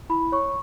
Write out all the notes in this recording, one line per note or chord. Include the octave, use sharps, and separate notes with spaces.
E4 B5
C#5 C#6